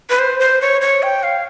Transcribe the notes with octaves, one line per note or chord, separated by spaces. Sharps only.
B4
C5
C5
C#5
C#5
G5
F5